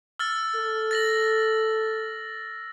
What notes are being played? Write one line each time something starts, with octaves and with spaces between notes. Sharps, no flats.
E6 F6 A6
A4
A6 A#6 F#7